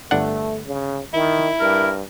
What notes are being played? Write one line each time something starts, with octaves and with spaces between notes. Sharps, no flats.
G1 A3 D4 F#5
C#3
D#3 E4
G2 A#4